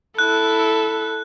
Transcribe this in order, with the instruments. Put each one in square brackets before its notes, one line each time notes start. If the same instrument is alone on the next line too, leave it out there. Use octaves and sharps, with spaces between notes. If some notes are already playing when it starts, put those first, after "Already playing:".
[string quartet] E4 [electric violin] A4 [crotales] F#6